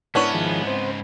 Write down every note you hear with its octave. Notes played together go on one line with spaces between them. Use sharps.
G#2 B3 C#4 D4 E4 A#4 C#5
D#3 F3 G#4
C4 C5